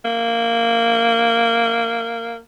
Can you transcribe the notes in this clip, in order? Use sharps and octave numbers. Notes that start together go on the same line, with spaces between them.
A#3